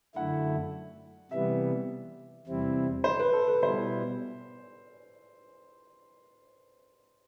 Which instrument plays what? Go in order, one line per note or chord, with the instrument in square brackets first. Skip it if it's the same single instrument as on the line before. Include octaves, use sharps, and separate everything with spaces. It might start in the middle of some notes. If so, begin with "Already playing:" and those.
[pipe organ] F#2 D3 A3 E4 [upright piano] F#5
[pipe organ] C3 E3 G3 B3 [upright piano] E5
[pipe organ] E2 C3 G3 C4 E4
[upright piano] C5
B4
A4
B4
[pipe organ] B2 G3 B3 E4 [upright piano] C5